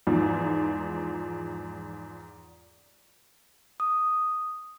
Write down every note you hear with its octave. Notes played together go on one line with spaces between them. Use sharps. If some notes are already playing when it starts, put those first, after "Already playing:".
E2 G#2 F3
D#6